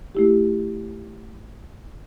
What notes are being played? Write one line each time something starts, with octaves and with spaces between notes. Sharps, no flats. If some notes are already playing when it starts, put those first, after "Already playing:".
A3 E4 G4